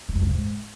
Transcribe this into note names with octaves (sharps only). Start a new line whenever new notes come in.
D#3
F#2
C#3
G#2